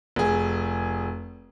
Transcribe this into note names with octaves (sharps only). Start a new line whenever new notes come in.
F1 G#4